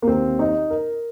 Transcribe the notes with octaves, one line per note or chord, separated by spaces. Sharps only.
A#3
D#2 D#3 C4
D#4
A#4